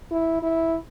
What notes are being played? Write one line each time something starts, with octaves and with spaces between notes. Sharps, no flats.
E4
E4